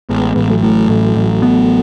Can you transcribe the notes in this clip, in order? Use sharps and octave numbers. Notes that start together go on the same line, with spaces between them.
A1 G#3 B3
A1
F#3 A3
A2
A1
A1
B3